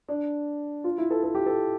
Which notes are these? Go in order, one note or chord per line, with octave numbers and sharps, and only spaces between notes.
D4
F4
E4
A4
A4
G4
A4